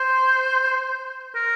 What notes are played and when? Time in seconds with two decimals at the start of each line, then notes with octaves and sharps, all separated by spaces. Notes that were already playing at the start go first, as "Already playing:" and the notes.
Already playing: C5
1.35 A#4